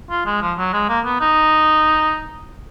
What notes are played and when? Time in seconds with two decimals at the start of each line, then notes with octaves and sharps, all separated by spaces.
0.10 F4
0.26 G#3
0.42 F3
0.58 F#3
0.73 G#3
0.89 A#3
1.05 B3
1.21 D#4